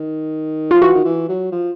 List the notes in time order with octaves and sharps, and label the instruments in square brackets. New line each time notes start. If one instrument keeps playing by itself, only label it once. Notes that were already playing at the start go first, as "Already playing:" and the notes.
Already playing: [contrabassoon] D#3
[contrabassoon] F3 [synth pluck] F4
[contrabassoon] E3 [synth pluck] F#4
[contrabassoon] D#3
E3
F#3
F3